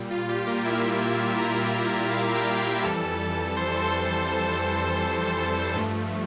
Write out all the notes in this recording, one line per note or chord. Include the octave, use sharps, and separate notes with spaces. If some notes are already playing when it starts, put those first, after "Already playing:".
Already playing: A#2 G3
F4
G4
A#3 A#4
E4 E5
A#4 A#5
F4 F5
G4 G5
G4 G5
G5
F2 E3 G3 A4 A5
C5 C6
A4 A5
A4 A5
C5 C6
G2 F3 A3